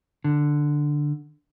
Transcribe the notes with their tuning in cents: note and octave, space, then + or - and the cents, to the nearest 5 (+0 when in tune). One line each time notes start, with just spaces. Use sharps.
D3 +5